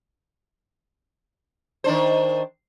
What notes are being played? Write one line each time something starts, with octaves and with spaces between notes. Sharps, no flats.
D#3 D4 C5